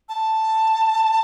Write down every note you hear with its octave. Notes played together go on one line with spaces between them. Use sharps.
A5